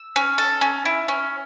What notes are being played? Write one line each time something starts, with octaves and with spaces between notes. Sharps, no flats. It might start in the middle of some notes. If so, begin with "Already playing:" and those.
Already playing: E6
C#4
A4
C#4
E4
C#4